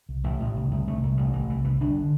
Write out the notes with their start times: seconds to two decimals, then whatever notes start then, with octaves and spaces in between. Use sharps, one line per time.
0.09 C2
0.24 A1 E3
0.40 A1
0.56 C2
0.71 C2
0.87 C2 A3
1.03 C2
1.18 A1 G3
1.33 A1 E3
1.49 C2 E3
1.64 C2 E3
1.80 G1 D4
1.96 D3